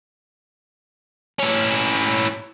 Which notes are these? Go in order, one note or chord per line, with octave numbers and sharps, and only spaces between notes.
C#4 E4